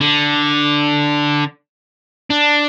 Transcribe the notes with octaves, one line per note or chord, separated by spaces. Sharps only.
D3
D4